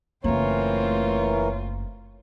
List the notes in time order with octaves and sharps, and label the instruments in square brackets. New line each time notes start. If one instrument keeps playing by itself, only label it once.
[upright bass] F#1 A#3 [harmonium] E3 A#4 [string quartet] A3 C4 F4 [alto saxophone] C#5